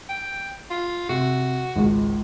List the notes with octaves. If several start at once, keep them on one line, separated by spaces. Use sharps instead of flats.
G5
F4
C3 F#4
G#1 C#2